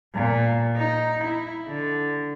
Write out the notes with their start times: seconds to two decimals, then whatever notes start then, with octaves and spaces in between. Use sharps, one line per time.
0.15 A#2
0.77 D#4
1.24 E4
1.69 D3